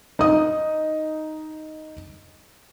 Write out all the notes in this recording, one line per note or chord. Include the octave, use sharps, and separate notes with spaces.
D#4 D#6